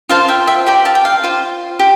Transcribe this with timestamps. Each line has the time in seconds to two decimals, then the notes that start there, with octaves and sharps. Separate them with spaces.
0.09 F4 C5 F5 A5
0.28 E5 G5
0.47 E5 G5
0.66 G4 D5 G5 A#5
0.85 F5 A5
0.95 G5
1.05 F5
1.24 F4 C5
1.79 G4